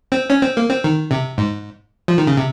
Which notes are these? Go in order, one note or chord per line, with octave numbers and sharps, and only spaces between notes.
C4
C#4
C4
A#3
C4
D#3
C3
G#2
F3
D#3
C#3
C3